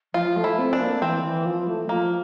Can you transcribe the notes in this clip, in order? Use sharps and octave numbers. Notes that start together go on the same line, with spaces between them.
F3 F4
A3
E4
C4
D4
A#3
E3 C4
E3
F3
A3
F3 A#3